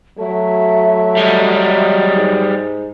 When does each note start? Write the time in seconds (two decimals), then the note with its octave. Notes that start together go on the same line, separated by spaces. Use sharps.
0.18 F#3 A3 E5
1.17 G3 G#3
2.16 G#2